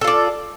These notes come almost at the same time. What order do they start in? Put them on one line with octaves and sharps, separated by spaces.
A4 F4 D5